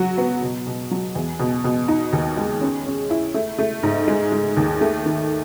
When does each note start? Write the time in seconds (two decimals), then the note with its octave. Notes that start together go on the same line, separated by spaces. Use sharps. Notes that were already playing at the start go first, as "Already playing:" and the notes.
Already playing: F#3 F#4
0.18 B3
0.42 B2
0.67 B2
0.91 F#3
1.15 E2
1.40 B2
1.64 B2
1.88 D#4
2.13 D#2
2.37 G#3
2.61 C#4
2.86 C#4
3.10 E4
3.34 A3
3.58 A3
3.83 G#2
4.08 G#3
4.32 G#3
4.57 D#2
4.81 A3
5.06 D#3